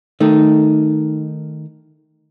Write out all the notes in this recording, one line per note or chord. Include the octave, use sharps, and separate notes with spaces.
D#3 A3 D#4